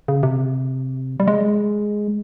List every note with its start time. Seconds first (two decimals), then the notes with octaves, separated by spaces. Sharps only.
0.08 C#3
0.23 C3
1.20 G3
1.28 G#3